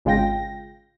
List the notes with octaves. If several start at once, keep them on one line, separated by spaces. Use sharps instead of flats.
G#1 C#3 G#3 F4 G5 A#6